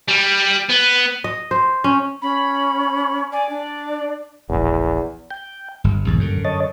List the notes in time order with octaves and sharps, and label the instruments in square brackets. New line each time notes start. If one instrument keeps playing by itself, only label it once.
[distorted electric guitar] G3
B3
[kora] D#5
C5
C#4
[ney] C#4 [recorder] B5
[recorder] D5 [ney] G#5
[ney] D4
[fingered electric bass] E1 A#1 [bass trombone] E2
[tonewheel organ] G5
[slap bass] G1 [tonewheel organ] G2
[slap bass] A#1 D#2
F#2 D3
[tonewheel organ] C#5 D#5 A5